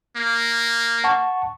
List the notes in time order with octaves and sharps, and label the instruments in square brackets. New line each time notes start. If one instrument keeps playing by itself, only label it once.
[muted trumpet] A#3
[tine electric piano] F#5 A5 C#6